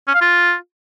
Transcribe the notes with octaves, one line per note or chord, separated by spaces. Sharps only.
C#4
F5
F4